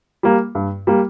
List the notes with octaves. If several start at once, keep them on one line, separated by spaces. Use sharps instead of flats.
G3 A#3
G2
G3 A#3